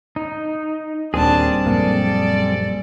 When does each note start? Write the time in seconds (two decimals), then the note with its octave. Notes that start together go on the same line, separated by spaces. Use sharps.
0.16 D#4
1.14 D#1 D#2 G3 C4 D4 G#4 A5
1.66 A#1 F#2 A#3 A4 D5